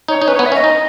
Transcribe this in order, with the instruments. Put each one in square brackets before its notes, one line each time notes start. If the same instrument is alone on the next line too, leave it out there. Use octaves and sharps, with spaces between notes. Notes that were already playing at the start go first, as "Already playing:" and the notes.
[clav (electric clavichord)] D#4 [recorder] C#5
[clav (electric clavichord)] D#4
[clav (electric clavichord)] C#4 [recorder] B4
[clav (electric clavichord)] B3 [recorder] C#5
[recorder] E5
[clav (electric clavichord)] C#4
[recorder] D#5
[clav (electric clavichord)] D#4